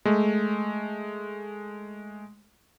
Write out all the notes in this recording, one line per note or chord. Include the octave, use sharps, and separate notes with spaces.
G#3 A3